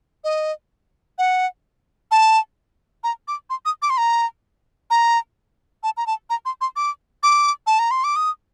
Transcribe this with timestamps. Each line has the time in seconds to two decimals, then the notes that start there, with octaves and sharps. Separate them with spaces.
0.24 D#5
1.18 F#5
2.11 A5
3.04 A#5
3.28 D6
3.50 C6
3.65 D#6
3.82 D6
3.90 C6
3.98 A#5
4.90 A#5
5.83 A5
5.97 A#5
6.07 A5
6.30 A#5
6.45 C6
6.61 C6
6.76 D6
7.23 D6
7.67 A5
7.79 A#5
7.91 C6
8.04 D6
8.16 D#6